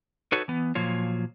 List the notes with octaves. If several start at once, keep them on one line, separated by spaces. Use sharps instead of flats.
D#4 F#4 A4 B4 C#5
E3 B3
A#2 F3 F#3 A#3 F4 C#5